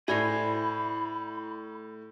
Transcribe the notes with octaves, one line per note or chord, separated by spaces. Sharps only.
A2 E4 C5 D5 E5 G#5 B5